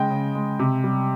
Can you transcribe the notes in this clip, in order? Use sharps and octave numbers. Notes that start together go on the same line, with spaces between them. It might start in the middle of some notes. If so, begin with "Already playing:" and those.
Already playing: C#3 G#3 D#5 G5
C#3
G#3
C3
G3